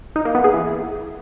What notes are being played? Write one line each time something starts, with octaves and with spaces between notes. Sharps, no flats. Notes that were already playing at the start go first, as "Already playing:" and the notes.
D#4
A#3
B3
G#4
E3